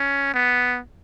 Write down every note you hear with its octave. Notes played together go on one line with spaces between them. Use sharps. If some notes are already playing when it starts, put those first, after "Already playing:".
Already playing: C#4
B3